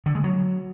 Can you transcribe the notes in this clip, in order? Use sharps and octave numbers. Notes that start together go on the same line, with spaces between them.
D3
G#3
F#3